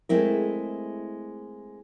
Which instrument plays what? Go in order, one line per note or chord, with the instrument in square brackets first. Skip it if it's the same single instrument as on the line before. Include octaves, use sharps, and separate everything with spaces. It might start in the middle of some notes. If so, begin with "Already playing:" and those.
[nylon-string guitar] G#3 A3 C4 E4 A#4